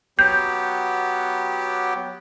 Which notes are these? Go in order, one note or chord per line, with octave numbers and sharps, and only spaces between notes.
F#3 B3 G4 G6